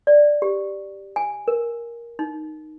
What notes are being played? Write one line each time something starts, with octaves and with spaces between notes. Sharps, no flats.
D5
G4
G#5
A#4
D#4